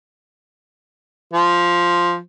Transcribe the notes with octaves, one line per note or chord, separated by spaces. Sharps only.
F3